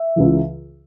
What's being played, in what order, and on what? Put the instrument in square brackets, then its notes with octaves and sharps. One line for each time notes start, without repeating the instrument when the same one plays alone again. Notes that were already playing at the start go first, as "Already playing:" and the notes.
Already playing: [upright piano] E5
C#2 C#3 E3